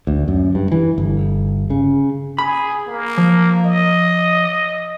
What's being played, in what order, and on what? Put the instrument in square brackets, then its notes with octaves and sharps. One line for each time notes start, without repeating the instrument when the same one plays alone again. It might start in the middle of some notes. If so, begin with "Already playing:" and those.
[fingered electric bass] D2
F#2
G2
E3
G1
C#3
[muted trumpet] G#4 [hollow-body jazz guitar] B5
[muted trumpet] A#3
[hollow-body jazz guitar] F3
[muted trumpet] D#5